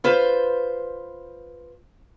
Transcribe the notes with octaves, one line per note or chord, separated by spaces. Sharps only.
F4 B4 C5